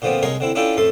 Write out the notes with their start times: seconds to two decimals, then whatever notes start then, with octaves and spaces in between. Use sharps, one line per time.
0.02 A#2 D3 F3 B3 C4
0.23 C2 G#3 D#4 A#4 C#5 C6
0.40 D3 C4 E4
0.55 C#4 D4 E4 F4 A4 G5
0.77 F2 A2 A3 A4 C6